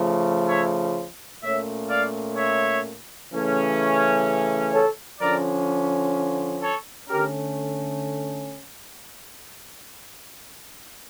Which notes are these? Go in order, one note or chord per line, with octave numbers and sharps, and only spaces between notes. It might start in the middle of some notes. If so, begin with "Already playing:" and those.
Already playing: C#3 F3 A3
C#5 E5
A#2 A3 C#4 C#5 E5
D5 F5
C#5 E5
C#3 E3 A3 C#4
A4 C#5
D3 F3 C#4 A#4 D5
A4 C#5
D3 A3 C#4 G4 A#4